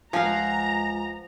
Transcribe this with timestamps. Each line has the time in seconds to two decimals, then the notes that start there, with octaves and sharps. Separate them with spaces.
0.13 C#2 F3 F5 F#5 G#5 A#5